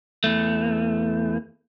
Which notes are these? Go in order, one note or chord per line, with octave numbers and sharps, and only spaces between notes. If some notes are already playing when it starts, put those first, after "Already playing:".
E2 A3